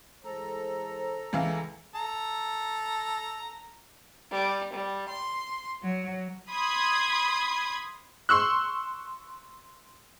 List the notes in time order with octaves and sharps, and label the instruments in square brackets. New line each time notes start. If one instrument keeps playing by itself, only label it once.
[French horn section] E3 G#3 C5 [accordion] A4 A#5
[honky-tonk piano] C#2 E3 F5
[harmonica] A4 A#5
[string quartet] G3
G3
C6
F#3
[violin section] B5 C6 D#6 G#6
[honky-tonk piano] C6 C#6 E6 F#6